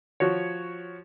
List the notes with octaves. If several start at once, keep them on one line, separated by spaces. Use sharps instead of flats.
F3 F#4 C#5